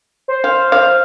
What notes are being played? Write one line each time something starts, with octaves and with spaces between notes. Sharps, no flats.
C5
F5
F5